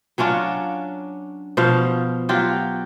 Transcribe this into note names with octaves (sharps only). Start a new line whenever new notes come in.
F#3 C#4 D4 F4
B2 F3 C5 F5
F#3 F4 G4